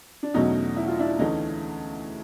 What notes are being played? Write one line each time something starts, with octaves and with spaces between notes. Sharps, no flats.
D4
E2 B2 F#3 A3 C#4 D#4
E4
F4
D4 E4
D2 C#3 E3 A3 C#4 D#4